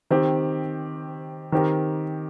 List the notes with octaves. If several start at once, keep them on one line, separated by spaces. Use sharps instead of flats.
D#3 C4 G4
D#3 C4 G4 A#4